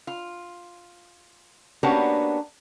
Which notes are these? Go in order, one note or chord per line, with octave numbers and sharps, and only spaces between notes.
F4
A#3 B3 C#4 D4 F#4 G4